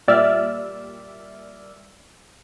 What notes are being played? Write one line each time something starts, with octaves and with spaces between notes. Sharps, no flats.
A#2 G3 D5 E5 E6 F6